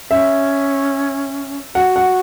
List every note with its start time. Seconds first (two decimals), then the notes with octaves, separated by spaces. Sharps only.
0.11 C#4 E5
1.75 F#4 F#5
1.96 F#5